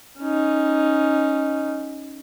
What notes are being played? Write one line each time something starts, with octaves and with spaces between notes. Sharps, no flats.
C#4 D#4